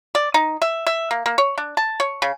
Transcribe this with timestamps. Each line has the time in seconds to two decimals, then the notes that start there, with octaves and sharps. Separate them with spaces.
0.15 D5
0.34 D#4
0.62 E5
0.87 E5
1.11 A#3
1.26 A#3
1.38 C#5
1.58 D4
1.77 A5
2.00 C#5
2.22 C#3